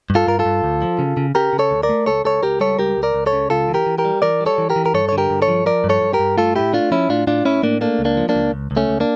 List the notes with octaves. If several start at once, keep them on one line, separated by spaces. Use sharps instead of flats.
G2
F4 A4
G2 A#4
F4 A4
G2
D2
F3
C#3
C#3
C#3 G4 A#4
C#3
A4 C#5
D2
A#4 D5
A3
C#2 A4 C#5
C#2 A4 C#5
C#2 G4 A#4
G3 A4 C#5
C#2 G4 A#4
C#2
A#4 D5
C#2
A4 C#5
C#3
C#2 F4 A4
E3
G4 A#4
E3
G4 A#4
G3
E3 A#4 D5
G3
A4 C#5
E3
G4 A#4
E3
A#4
G2 A4 C#5
D3 C#5
G4 A#4
G2
A4 C#5
F3
F3 A#4 D5
G2
A4 C#5
G2
G4 A#4
G2
A3 F4 A4
A2 E4 G4
A3 D4 F4
F3 C#4 E4
A2 D4 F4
A2 D4 F4
A2 C#4 E4
A2 A#3 D4
A3 A#3 D4
C#2
A#3 D4
F3
A#3 D4
C#2
C#2
C#2
A3 C#4
C#2
A#3 D4